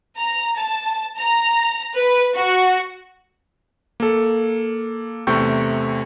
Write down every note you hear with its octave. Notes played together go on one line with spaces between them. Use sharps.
A#5
A5
A#5
B4
F#4
A#3 A4
E2 C3 A3 G5 C#6 G6